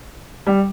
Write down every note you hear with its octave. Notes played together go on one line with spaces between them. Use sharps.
G3